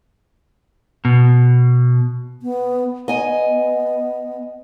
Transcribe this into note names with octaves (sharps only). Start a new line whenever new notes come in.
B2
B3
B3 D#5 G#5